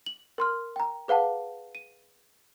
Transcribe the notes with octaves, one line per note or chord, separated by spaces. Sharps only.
F#7
A#4 C6 F6
G5 A#5
G#4 B4 F5 F#5 A5
D#7